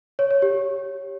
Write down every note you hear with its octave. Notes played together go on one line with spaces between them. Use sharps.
C#5
C#5
G4